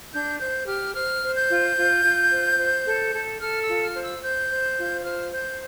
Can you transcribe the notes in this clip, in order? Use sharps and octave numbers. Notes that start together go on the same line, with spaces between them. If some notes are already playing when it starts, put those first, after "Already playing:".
D4 G6
C5 G6
G4 F6
C5 F6
C5
G6
F4
F4
F4
C5
C5
A4
A4
A4 F6
E6
F4
F6
C5
E6
C5 G6
C5
F4
C5 F6
C5 G6